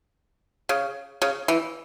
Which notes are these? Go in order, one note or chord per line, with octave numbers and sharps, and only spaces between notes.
C#3
C#3
E3